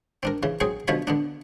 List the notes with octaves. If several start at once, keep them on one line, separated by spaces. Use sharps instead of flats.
C4 D4 A#4
C#3 E3
F#3 C4 G#4 C5
B1 B2 D3 F3 C#5 B5
D3 B3 D4